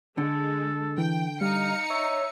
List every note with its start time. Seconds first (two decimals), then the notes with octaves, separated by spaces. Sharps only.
0.18 D3 G#3 A4
0.98 E3 G5
1.41 G3 D#4 F5 C#7
1.90 C#5 E5